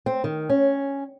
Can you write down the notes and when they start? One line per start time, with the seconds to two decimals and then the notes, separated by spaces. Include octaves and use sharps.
0.06 C4
0.24 D#3
0.50 C#4